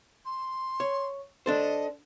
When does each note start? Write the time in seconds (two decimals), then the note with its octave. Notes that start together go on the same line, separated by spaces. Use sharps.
0.25 C6
0.80 C#5
1.46 D4 A4 C5 D#5